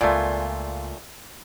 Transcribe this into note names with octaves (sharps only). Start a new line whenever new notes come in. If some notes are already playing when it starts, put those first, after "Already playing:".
C#2 A#2 A3 C4 F4 D5 G#5